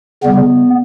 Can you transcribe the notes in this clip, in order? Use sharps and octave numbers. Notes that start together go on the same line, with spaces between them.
C#3 G3 B3